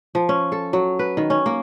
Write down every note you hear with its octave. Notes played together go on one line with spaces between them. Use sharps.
F3
C#4
A4
F#3
B4
D#3
C#4
A#3